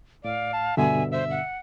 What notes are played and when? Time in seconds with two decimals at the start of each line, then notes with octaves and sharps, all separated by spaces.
0.24 A2 D5 F5
0.53 A5
0.77 G2 B2 D3 E5 G#5
1.12 C5 E5
1.31 F#5